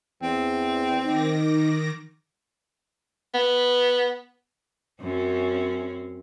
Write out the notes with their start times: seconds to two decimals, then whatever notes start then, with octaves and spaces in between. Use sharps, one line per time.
0.23 E2 C4
1.06 D#3 D#4 D6 A#6
3.34 B3
5.00 F#2 C4 C#4